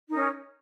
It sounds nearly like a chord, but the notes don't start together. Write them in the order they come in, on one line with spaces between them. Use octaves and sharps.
D#4 A#4 C#4